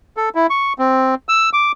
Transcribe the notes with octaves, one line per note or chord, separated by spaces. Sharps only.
A4
E4
C#6
C4
E6
D6